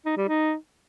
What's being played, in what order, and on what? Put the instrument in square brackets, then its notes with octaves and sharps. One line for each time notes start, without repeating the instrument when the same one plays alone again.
[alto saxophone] D#4
G3
D#4